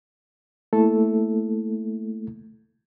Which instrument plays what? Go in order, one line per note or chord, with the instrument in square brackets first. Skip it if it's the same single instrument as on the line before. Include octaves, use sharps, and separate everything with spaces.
[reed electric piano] A3 A#3 E4 A4